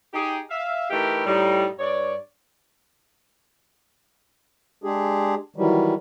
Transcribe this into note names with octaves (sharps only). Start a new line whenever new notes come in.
D#4 G4 G#4
E5 F5
E3 A3 D#4 G4 A#4 B4
A2 G3 D#4
G2 C#5 D5
G#3 D4 G4 G#4
D#3 E3 F#3 G3